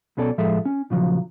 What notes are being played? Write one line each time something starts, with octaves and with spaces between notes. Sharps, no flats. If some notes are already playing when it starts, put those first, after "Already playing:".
B1 B2 C#4 A4 D5
A2 F3 G#3 A4 E5
C#4
A#2 C#3 F3 F#3